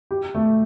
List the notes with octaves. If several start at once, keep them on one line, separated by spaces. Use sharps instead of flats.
G4
A3